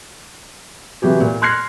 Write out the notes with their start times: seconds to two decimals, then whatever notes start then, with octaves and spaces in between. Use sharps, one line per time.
1.02 C3 E3 F#3 G4 G#4
1.21 A#2
1.42 C6 F6 F#6 G#6 A#6 C7